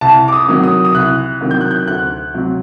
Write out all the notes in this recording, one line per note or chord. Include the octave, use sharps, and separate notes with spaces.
C2 A5
D6
D#6
C3 D#3 F#3
D#6
D#6
C2 F#6
C3 D#3 F#3
G6
F#6
G6
D2 F#6
C3 F#3